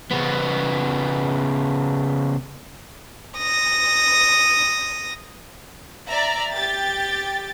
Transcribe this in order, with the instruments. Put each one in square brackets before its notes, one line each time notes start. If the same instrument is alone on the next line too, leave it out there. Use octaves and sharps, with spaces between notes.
[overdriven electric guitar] C#3 B3
[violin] D#6 A#6
[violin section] D5 E5 A#5
G4 G5 A6